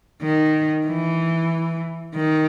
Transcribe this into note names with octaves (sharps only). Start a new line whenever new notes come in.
D#3
E3
D#3